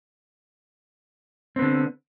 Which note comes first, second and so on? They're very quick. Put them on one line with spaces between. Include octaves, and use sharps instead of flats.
C4 B3 D3